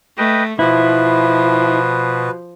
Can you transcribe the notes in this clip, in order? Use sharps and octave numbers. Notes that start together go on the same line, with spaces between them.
A3 B4 D#5 G5
B2 F3 E4 B4